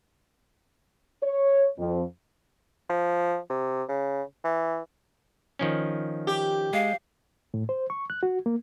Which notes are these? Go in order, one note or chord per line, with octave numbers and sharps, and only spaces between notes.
C#5
F2
F3
C3
C#3
E3
D#3 F3 C#4
G4
G#3 F5
A2
C5
C#6
F#6
F#4
A#3